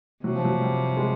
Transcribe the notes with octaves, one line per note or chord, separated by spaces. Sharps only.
C3 F#3
F3
F#3
G3
G#3